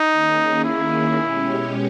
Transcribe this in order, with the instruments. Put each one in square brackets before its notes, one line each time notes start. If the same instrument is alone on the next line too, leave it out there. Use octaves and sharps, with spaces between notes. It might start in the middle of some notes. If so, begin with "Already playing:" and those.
Already playing: [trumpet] D#4
[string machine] D#3 A#3 C#4 G#4
[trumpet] E4
[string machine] B2 G#3 C#4 G4 C#5